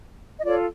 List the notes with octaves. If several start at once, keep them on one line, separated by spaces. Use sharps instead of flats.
D#5
F4 A4 C#5 D5